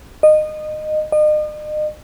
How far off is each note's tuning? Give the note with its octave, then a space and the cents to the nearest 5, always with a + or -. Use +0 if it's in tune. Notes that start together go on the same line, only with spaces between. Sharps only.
D#5 -20
D#5 -40